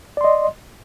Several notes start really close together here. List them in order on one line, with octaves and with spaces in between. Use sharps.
D5 C6 D#5